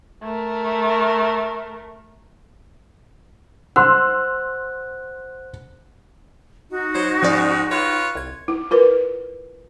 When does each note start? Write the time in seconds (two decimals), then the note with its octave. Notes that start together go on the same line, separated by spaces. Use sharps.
0.23 A3 A#4
3.76 C5 F#5 C6 E6 F#6
6.70 D#4 F#4
6.94 F#3 C5
7.23 G#2 F3 C#4 D5
7.71 F4 B4 C#5 G#6 E7
8.15 C2 G#6
8.48 E4
8.71 F4 A#4 B4